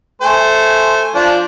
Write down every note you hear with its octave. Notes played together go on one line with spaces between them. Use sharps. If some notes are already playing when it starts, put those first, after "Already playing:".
A3 C5 G#5
F3 D4 D5